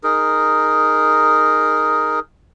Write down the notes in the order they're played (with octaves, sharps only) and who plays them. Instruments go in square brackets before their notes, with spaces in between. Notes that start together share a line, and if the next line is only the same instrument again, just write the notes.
[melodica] D#4 G#4 A#4